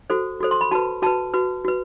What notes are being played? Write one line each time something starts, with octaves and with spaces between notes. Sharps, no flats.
F#4 A4 C5
F#4 A4 C5
C6
B5
F#4 B4 A5
F#4 B4 A5
F#4 B4
F#4 B4